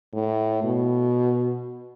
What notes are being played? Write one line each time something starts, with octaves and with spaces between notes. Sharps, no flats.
A2
B2